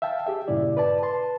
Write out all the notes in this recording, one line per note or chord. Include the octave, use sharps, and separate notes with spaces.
E5 F5 G5 A5
G4 G#4 E5
G2 A#2 C#3 E4 D5
B4 D5 A5
B4 A5 C6